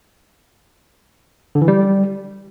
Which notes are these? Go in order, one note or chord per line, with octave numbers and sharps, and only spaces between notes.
D3
E3
G3